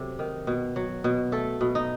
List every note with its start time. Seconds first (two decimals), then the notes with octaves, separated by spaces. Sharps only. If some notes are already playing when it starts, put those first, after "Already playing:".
Already playing: C3 F#3 A4
0.19 D#3
0.47 B2
0.76 F#3
1.04 B2
1.32 A3 A4
1.61 B2
1.75 D#4